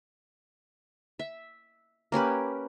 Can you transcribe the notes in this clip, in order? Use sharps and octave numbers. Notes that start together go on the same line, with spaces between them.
E5
A#3 C#4 G4 B4